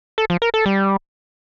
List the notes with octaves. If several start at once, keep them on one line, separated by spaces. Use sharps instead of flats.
A4
F3
A#4
A4
G3